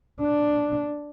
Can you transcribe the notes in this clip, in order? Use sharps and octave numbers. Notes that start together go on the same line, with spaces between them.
D4